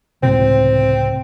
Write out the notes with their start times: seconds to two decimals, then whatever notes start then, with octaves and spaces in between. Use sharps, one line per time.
0.23 C#2 A2 C3 C4